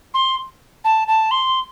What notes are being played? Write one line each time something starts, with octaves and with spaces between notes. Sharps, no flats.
C6
A5
A5
C6